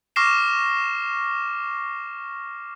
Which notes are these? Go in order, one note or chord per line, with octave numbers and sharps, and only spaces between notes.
C#6 D6 F6 A#6 C7 E7